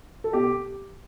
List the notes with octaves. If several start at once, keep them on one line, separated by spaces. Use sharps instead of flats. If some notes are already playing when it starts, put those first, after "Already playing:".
A4
B2 G4